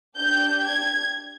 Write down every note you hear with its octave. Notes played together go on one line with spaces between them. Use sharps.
D4 G4 G6
G#6